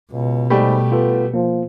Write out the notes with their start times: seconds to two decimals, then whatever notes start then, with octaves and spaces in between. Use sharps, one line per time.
0.12 C#2 B2
0.50 G#2 G3 A3 G4 B5
0.92 B3 F4 A4
1.34 F3 A#3